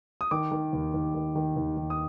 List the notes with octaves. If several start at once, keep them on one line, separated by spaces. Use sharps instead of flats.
D#6
D#3 D6
D#3
D#2
D#2
D#3
D#3
D#2
D#2
D#6